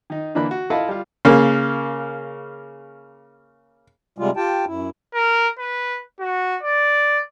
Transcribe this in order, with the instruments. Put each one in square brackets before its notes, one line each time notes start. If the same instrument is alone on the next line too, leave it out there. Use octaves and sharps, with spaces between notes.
[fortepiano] D#3 D#4
D3 E3 A#3 D4 B5 F#6
F#4
E4 F4 A4 D#5 F5 B5
G3 F4
C#3 A#3
[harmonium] C3 G3 G#3 F4
F4 G4 G5 A5
F#2 E4
[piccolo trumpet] A#4
B4
F#4
D5